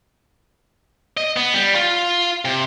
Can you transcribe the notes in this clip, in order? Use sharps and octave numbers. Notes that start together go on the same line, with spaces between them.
D#5
B3
G3
F4
C3